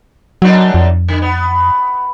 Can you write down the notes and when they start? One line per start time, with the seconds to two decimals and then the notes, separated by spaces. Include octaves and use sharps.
0.42 F#2 F#3 D4 D#4
0.74 F2
1.08 D3
1.22 B3